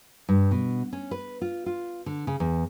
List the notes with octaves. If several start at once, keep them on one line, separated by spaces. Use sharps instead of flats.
G2
B2
C#4
B4
F4
F4
D3
C#3
E2